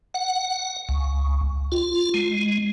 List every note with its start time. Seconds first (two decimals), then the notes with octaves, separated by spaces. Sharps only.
0.14 F#5
0.89 C#2
1.72 F4
2.14 G#3